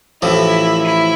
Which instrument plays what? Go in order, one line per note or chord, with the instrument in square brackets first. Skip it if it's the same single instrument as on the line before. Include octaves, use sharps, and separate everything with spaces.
[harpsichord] A1 A2 F3 C4 [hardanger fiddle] E4
[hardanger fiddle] E4